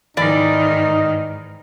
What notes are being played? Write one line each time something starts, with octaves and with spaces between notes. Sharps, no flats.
G#2 D#3 E3 D#4 D5